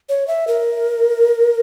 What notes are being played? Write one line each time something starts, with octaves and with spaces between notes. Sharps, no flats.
C#5
E5
A#4